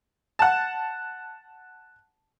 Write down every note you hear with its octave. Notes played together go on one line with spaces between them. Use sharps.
F#5 A5